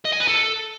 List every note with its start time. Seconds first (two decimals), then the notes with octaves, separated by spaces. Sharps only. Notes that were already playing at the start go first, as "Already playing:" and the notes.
0.05 D#5
0.12 G#5
0.20 B4
0.28 A4